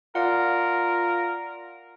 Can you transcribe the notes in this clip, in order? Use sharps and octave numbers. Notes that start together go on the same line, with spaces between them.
F4 A#4 D5 F#5